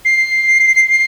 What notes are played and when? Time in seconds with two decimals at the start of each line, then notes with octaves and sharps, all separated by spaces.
0.05 C7
0.91 C7